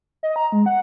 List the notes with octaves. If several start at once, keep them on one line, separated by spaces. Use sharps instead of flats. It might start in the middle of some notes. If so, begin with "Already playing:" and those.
D#5
A#5
G#3
F#5